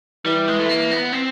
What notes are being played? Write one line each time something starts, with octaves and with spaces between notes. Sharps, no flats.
E3 G3
G#3
A3
A#3
B3
C4